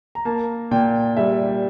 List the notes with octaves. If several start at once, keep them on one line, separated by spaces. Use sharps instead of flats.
A#5
A#3 A5
A#2 G5
G3 E5